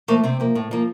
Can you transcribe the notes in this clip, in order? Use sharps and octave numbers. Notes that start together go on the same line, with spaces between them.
F3 A3 A#3
C3 C4
F3 A#3
A2
F3 A#3